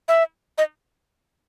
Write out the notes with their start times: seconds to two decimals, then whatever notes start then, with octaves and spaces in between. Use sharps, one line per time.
0.08 E5
0.58 D#5